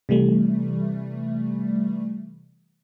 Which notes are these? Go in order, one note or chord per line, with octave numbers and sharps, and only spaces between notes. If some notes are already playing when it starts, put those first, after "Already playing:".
C3 E3 G3 A3